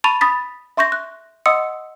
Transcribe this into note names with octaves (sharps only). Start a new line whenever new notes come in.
A5 B5 C#6 A6 D#7 F7
B5 D#6 A6 B6
E5 C6 C#6 G6 A#6
F#6
D#5 F#5 C6 D#6 E6 C#7